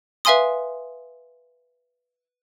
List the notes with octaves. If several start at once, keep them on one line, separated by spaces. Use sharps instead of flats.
B4 E5 F5 G#5 C6 D#6